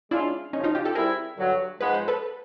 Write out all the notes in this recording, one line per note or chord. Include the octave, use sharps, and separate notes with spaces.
G#3 C#4 D4 E4 F4
F#2 C#3 F3 C#4 D#4
D#4 F4
F4 G4
G4 A4
G3 C4 E4 G#4 A#4
G2 D3 F#3
G#2 F3 G#3 B3 B4
C5
A4 B4